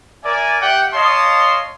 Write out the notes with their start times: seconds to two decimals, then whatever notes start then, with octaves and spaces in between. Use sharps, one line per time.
0.25 A#4 D5 E5 G#5
0.62 G4 E5 F#5 G5
0.94 C#5 D#5 F5 A5 C6